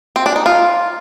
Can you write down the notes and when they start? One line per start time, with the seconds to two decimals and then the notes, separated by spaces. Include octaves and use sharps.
0.16 C4
0.26 D4
0.36 D#4
0.46 F4